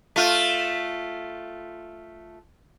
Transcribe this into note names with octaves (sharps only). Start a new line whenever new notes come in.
A3 F4